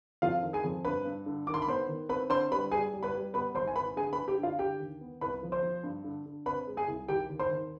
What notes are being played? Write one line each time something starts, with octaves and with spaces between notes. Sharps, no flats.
F2 F4 F5
D#3
G#4 G#5
F2
G2 B4 B5
G2
D3
D#3 D6
C6
B5
B3 C5 C6
D#3
C4 B4 B5
D3 C5 C6
G3 B4 B5
G3 G#4 G#5
G3
B4 B5
G3
B3 B4 B5
G#1 C5 C6
G#5
G#1 B4 B5
D3 G#4 G#5
B4 B5
D3
G4 G5
D3 F4 F5
D3 G4 G5
D#2
B3
C2 B4 B5
F3
C5 C6
F3
G2
D3
D3
C4 B4 B5
G#3
G#4 G#5
C2
D#2 G4 G5
D#2
C5 C6
D#2